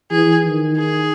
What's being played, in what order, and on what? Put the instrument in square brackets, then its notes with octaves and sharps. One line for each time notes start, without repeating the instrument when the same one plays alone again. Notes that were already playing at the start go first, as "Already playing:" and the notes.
[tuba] E3 [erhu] G#4
[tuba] D#3
[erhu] G#4